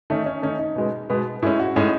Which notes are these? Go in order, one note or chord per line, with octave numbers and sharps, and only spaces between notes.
D#3 A3 C#4 D#4
C#4
D#3 A3 C#4 D#4
D#4
B2 G#3 B3
B2 G#3 B3
A2 G#3 C#4 E4
F#4
A2 G#3 C#4 D#4